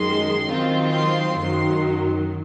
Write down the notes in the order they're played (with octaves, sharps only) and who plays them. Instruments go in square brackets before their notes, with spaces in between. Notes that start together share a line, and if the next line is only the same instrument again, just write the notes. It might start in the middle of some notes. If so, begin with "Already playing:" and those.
Already playing: [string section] F#2 D#3 G#3 C6
D#3 F#3 C4 F4
C6
F#2 D#3 F#3 C6